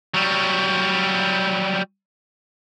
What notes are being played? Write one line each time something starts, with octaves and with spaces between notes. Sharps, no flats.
F#3 G3